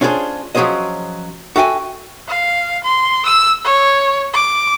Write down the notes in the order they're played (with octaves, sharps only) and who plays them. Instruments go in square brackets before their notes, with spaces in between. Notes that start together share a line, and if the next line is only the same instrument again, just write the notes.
[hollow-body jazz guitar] C#4 D4 F4 G4 G#4 C5
F3 F#3 C#4 G#4 C5 D#5
F#4 A4 E5 F5 G5 G#5
[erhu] F5
C6
E6
C#5
D6